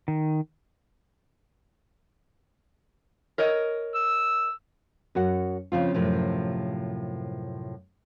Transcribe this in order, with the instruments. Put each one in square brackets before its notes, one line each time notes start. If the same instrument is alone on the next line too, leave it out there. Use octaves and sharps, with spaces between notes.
[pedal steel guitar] D#3
[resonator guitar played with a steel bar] A#4 C#5 D#5
[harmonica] E6
[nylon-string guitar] F#2 F#4 F#5
C#3 F3 C4 F4
F#2 A2 C3 F3